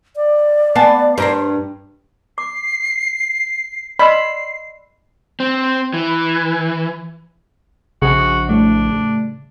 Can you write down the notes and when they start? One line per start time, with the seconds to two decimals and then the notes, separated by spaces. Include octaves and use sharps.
0.16 D5
0.75 B3 F5 G#5 A5
1.18 G2 C4 A#4 C5
2.38 D6 C7
3.99 D5 D#5 B5 C6 E6 C7
5.40 C4
5.94 E3
8.02 A#1 C#3 F#4 G#4
8.49 A2 G3 A3 D4